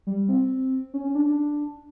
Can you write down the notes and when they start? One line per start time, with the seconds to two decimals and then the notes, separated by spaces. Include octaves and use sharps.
0.07 G3
0.29 C4
0.94 C#4
1.04 C#4
1.15 D4
1.26 D4